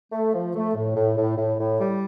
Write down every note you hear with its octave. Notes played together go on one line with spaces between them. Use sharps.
A3
F3
A3
A2
A2
A2
A2
A2
G3